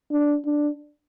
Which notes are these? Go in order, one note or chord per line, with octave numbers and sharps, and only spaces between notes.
D4
D4